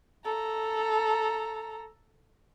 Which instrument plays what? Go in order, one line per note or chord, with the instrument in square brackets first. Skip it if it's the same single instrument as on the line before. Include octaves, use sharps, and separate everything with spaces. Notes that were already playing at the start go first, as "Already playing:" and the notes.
[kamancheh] A4 A#5